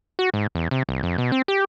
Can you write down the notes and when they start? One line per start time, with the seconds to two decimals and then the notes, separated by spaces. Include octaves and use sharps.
0.19 F#4
0.34 G#2
0.55 E2
0.71 C3
0.89 C2
1.03 F2
1.18 B2
1.32 C4
1.48 G4